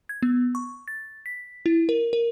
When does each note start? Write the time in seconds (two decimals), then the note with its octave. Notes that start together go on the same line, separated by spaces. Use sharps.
0.09 G#6
0.22 B3
0.55 C#6
0.88 A6
1.26 B6
1.66 E4
1.89 A#4
2.13 A#4